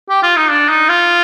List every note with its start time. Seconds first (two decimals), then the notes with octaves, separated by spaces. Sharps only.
0.09 G4
0.23 F4
0.37 D#4
0.51 D4
0.69 D#4
0.89 F4